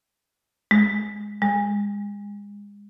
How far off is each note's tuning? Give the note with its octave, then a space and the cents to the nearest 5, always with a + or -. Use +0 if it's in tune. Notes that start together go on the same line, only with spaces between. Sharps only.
G#3 +0
G#3 -30